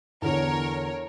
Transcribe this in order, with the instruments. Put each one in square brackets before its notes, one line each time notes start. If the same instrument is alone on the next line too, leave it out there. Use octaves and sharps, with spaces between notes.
[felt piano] E2 D3 [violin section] A#4 C#5